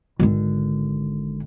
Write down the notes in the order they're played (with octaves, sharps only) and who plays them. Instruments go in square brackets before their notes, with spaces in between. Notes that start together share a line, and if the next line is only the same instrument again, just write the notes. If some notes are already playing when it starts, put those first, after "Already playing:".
[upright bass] G#1 D3